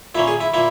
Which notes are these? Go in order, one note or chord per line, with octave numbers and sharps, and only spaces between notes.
A#2 A#3 C#4 E4
G#4
E4
A#2 A#3 E4